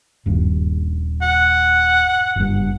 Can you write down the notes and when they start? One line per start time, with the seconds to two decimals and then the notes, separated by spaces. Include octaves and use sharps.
0.26 D#1 G2
1.22 F#5
2.36 F#1 G2